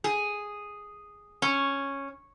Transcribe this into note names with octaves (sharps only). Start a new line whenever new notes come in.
G#4
C#4